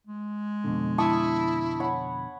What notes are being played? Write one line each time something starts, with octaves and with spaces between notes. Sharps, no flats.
G#3
F2 B2 D3
E4 A5 C#6 D#6
C#5 F#5 B5